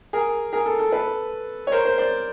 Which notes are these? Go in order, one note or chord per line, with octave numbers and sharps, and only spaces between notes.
G#4 A#4
G#4 A#4
A4
A4
A4 B4
C#5
A#4 C5
A#4 C5
C5 D5